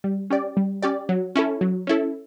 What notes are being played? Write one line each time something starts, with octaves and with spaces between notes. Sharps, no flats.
G3
C#4 G4 D5
G3
C#4 G4 D5
F#3
C#4 E4 A4
F#3
C#4 E4 A4